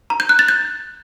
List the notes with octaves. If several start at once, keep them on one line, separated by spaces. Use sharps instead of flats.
A#5
G6
F#6
A6
G6